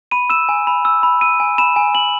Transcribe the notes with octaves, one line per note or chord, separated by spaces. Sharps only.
B5 D#7
E6 E7
G#5
B5
E6
B5
E6 D#7
G#5
B5 E7
G#5
G#5 F#7